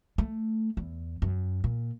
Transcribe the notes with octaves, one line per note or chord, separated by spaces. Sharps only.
A3
E2
F#2
A#2